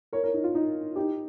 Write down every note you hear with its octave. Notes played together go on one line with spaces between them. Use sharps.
A#4 C#5
A#4 C#5
D#4
F4
D#4
D#4 G4